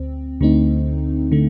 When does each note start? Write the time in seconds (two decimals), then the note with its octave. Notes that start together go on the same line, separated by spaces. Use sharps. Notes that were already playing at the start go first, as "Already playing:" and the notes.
Already playing: D2 C4
0.41 D2 D3 A3 C4 D#4
1.32 D3 A3